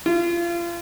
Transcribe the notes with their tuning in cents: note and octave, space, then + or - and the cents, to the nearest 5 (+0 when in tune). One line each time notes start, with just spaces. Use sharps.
F4 -30